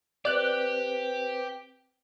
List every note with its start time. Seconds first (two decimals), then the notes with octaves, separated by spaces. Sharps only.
0.25 C4 G4 B4 C5 D5 F#6